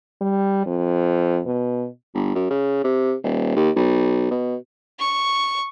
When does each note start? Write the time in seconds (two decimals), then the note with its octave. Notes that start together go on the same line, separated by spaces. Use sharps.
0.21 G3
0.66 F2
1.46 B2
2.14 G1
2.35 F#2
2.50 C#3
2.84 C3
3.23 D#1
3.56 D#2
3.76 B1
4.31 B2
4.99 C#6